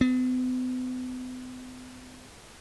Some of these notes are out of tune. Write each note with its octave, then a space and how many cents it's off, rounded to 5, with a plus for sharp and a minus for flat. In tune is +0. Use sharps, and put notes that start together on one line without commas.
B3 +45